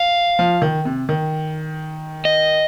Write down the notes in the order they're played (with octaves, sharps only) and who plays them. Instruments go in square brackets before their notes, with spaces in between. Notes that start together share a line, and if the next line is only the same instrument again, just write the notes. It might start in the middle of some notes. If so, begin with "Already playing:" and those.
Already playing: [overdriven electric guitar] F5
[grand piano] F3
D#3
C3
D#3
[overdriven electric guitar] D#5